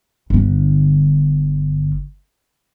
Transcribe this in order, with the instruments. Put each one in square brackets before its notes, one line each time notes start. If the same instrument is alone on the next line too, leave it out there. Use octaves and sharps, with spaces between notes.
[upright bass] G1 D3